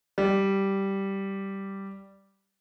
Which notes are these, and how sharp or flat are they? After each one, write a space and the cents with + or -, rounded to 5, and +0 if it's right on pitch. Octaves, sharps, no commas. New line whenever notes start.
G3 -5